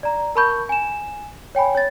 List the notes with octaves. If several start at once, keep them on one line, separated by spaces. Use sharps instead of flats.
D5 A#5
A#4 A5 B5 C#6 G6
G#5 E7
C#5 G5 G#5 B5
C#5 A6